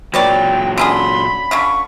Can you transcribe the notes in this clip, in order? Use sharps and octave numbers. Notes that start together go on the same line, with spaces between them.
A#2 F#3 B4 C#5 D5 G5
D3 C#4 G#4 B5 C6
D3 C#4 F4 C#6